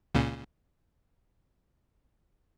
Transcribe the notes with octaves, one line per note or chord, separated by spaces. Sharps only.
C#2 A#2 C#3